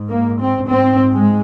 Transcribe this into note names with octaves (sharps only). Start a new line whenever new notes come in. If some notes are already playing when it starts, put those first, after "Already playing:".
Already playing: G#2
A#3
C4
G#2 C4
G#3